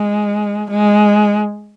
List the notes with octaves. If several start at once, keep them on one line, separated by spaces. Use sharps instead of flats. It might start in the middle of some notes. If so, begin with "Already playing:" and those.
Already playing: G#3
G#3